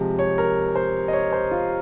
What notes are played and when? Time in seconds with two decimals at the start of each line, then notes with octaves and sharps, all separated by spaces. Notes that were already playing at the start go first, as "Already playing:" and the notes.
Already playing: C3 F3 G#3
0.19 C#5
0.38 A#4
0.76 C5
1.08 D#5
1.13 C#5
1.33 C5
1.51 F4